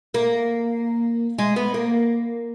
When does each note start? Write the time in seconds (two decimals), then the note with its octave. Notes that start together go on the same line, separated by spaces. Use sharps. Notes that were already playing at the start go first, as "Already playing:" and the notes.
0.14 A#3
1.38 G#3
1.56 B3
1.74 A#3